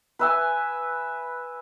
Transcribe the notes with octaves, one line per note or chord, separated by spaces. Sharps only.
B4 E5 G#5